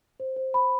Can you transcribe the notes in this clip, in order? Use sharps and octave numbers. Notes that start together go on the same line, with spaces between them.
C5
C5
B5